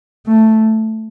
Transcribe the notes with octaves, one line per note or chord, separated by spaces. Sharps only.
A3